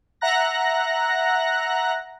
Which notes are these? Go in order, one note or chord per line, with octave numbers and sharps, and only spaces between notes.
E5 F#5 A#5 F#6 A#6